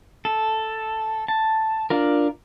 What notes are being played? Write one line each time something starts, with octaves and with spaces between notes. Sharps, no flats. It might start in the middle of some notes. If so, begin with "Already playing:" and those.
A4
A5
D4 F4 A#4